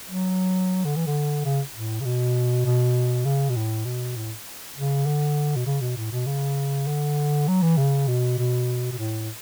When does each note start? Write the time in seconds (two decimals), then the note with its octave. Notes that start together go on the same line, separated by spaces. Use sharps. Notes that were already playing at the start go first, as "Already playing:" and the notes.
0.09 F#3
0.85 D3
0.96 E3
1.07 D3
1.45 C#3
1.75 A2
2.00 C#3
2.05 B2
2.66 B2
3.25 C#3
3.50 B2
3.56 A2
3.85 B2
4.16 A2
4.76 C#3
5.07 D3
5.56 B2
5.66 C#3
5.81 B2
5.97 A2
6.12 B2
6.27 C#3
6.87 D3
7.48 F#3
7.62 E3
7.77 C#3
8.08 B2
8.38 B2
8.92 B2
8.98 A2